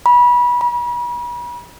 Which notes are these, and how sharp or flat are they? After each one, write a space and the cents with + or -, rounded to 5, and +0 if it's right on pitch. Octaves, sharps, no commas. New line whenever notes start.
B5 -25
B5 -40